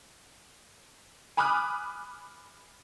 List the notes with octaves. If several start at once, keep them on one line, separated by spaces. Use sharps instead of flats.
G#5 B5 D6 D#6 F6 F#6